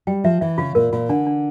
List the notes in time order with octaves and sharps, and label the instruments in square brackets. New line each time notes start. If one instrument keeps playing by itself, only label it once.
[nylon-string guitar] G3 [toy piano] G5
[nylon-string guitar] F3 [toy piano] E5
[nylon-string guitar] E3 [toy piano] E5
[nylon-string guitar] C#3 [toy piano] F4
[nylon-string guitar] A#2 [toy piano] A#4
[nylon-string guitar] A#2 [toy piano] F4
[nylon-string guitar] D3 [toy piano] D4
[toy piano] D4